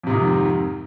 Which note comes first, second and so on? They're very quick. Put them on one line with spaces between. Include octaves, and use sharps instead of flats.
F2 C3 G#2 D#3